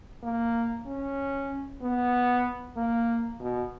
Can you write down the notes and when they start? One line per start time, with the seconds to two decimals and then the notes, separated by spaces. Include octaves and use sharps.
0.23 A#3
0.86 C#4
1.82 B3
2.77 A#3
3.40 B2